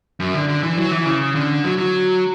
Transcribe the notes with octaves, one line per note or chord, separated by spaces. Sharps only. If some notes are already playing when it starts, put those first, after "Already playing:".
F#2
D3
D3
E3
F#3
E3
C#3
D3
F#3
F#3